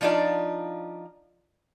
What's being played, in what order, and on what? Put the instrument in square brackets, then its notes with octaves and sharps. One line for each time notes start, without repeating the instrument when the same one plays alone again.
[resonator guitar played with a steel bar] F3 D4 D#4 F4 D5